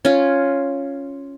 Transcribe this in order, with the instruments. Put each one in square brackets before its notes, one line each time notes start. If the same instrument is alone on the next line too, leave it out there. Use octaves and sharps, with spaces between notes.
[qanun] C#4 F4